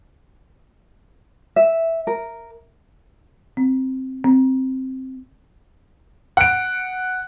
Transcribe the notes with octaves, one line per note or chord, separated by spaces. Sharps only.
E5
A#4
C4
C4
F#5 D7